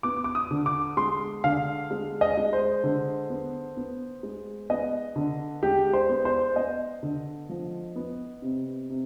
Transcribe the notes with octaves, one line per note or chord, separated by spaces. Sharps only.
B3 D6
D6
D#6
D3
D6
G#3 C6
D3 F5
G#3
D#5
G#3
C5
D3
B3
B3
G#3
B3 D#5
D3
G#3 G4
C5
B3
C5
B3 D#5
D3
F3
B3
C3
C3